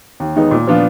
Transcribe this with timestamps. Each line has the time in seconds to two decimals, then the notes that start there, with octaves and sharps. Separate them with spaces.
0.20 D#2
0.36 D#3 G#3 B3 D#4
0.51 A#2
0.67 F3 B3 D4 F4